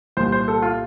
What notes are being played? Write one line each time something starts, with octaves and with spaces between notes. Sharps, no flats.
C2 A#2 C5
C5
A4
F4